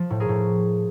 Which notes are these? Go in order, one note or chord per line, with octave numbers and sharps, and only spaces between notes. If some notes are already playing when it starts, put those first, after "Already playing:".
Already playing: F3
A2
G#4 A#4
A2